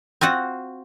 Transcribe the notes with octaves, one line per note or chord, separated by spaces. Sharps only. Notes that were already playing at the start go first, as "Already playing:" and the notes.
C4 F4 F#4 F#5